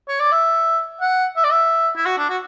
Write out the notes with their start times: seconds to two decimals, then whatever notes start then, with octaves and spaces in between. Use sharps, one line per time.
0.08 C#5
0.20 D5
0.32 E5
1.01 F#5
1.36 E5
1.44 D5
1.51 E5
1.96 E4
2.06 F#4
2.18 D4
2.29 F#4